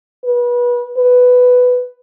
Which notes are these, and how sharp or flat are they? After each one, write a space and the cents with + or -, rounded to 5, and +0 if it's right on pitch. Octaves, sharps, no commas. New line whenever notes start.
B4 -30
B4 +5